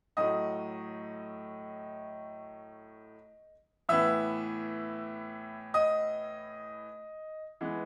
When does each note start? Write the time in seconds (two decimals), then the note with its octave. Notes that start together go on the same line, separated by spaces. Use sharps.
0.17 A2 F#3 A3 D#5 D#6
3.89 A2 E3 B3 E5 E6
5.74 D#5 D#6
7.61 E3 G#3 B3